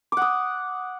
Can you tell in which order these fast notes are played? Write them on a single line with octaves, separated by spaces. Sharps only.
D6 F#5 D#6